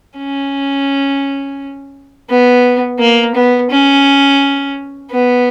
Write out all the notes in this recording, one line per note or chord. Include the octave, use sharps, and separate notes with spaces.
C#4
B3
A#3
B3
C#4
B3